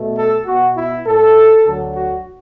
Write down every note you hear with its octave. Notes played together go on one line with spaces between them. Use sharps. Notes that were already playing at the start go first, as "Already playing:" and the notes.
Already playing: B2 A3
A4
B2 B3 F#4
E4
A2 A3 A4
D2 D3 F#3
F#4